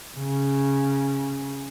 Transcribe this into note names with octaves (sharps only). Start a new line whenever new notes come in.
C#3